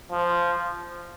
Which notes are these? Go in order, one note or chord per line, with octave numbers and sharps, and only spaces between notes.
F3